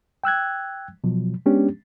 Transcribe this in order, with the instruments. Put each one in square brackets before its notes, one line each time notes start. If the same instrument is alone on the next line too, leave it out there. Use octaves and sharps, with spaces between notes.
[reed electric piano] G5 E6 F#6 G#6
B2 F3 F#3
G#3 B3 C#4 D4 G4